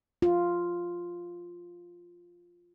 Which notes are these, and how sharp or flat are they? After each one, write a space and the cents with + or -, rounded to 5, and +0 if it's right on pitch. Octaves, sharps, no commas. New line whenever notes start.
F4 +0